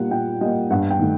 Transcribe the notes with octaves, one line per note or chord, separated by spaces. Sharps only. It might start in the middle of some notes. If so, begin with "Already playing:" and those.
Already playing: A#2 G3 A#3 F#5
A#2 G5
G3 A#3 D#5
G2 F#5
G5
D#3 A3